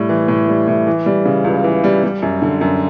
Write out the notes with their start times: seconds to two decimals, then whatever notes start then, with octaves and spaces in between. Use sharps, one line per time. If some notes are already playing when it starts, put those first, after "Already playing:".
Already playing: A2 G3
0.09 E3
0.28 A2
0.49 G3
0.68 A2
0.87 E3
1.06 G3
1.25 C#3
1.44 C#2
1.64 E3
1.84 G3
2.04 G3
2.22 F#2
2.42 D3
2.61 F#2